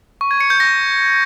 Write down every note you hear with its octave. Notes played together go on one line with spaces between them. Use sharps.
C#6
G#6
C#7
G6
A#6